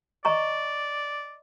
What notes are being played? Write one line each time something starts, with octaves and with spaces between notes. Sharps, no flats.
D5 D#5 A#5 C#6